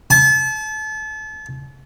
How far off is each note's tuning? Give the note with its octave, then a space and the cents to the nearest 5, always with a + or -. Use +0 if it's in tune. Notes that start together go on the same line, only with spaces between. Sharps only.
A5 -35